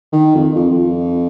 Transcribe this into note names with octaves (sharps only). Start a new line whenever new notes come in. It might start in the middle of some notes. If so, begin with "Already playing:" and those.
D#3
F2
F2
F2